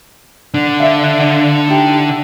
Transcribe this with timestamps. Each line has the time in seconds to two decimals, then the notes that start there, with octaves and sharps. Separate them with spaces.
0.54 D3 D4
0.79 E5 F5
1.67 D#4 E4 G4